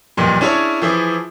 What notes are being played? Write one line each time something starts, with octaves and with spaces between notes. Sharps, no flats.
D#1 B1 F2 A#2
C#4 D4 E4 G#4 C#5
E3 F3 E4 G#4